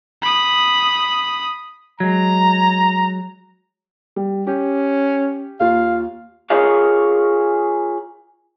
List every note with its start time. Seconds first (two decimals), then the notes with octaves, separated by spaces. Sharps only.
0.22 B5 D#6
2.00 F#3 G#3 A#5
4.16 G3
4.47 C#4 G4
5.60 D#2 F4 F5
6.50 F4 G#4 A#4 C#5 F5